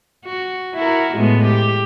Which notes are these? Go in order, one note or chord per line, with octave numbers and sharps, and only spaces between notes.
F#4
E4 F#4 A#4
A2 G#3 B3
G4